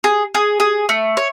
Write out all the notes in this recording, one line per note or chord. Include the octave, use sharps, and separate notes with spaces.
G#4
G#4
G#4
A3
C#5